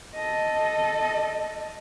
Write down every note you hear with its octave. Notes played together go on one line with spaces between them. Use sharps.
A4 D#5